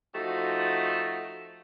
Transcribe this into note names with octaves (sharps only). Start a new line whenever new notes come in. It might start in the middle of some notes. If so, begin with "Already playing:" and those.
F3 A3 D#4 F#4